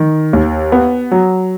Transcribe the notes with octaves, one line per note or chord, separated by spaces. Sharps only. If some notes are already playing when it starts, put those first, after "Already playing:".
Already playing: D#3
D#2
B3
F#3